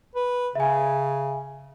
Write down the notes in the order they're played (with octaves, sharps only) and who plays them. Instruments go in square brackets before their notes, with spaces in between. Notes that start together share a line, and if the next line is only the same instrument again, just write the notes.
[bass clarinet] B4
[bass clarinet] C#3 [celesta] E5 G#5